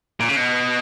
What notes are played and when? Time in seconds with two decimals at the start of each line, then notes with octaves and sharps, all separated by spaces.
0.20 A#2
0.29 C#3
0.36 B2